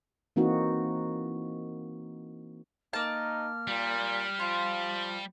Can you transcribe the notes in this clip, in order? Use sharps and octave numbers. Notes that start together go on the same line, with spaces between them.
E3 A#3 C4 D#4 F#4
A#3 D#4 A5 F6
A#2 G3
F3 F4